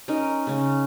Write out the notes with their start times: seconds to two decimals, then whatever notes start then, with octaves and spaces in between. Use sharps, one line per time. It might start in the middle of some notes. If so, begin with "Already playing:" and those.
0.08 C#4 D#4 A#4 D#5
0.47 C#3 C#4